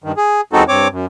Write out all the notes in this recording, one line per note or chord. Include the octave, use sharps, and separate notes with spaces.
G2 D#3
G#4
E2 G#3 C4 D#4 F#4 A4
G2 C4 C#5 D6
F#2